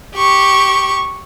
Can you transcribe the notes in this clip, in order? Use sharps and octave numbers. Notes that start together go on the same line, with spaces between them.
G4 C#6